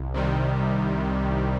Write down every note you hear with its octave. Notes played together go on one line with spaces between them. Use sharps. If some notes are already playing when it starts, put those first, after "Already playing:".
Already playing: C2
C3 D#3 G3
C2